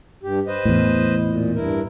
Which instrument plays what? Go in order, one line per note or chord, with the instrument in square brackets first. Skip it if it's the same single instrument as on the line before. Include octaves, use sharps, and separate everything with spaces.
[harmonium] G2 G4
B4 C5 D#5
[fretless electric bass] E2 A2
[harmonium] A#2
G2 E4 A#4